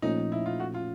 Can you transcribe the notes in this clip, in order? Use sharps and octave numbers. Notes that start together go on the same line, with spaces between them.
A#2 F3 A3 C#4 D#4
E4
F4
F#4
F4